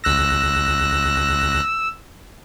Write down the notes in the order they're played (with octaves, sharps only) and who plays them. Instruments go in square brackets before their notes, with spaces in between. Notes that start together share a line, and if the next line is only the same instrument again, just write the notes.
[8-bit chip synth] C#2 F#6 A#6 [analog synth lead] E6